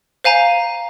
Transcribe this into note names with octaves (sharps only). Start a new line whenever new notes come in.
C5 F5 G#5 A#5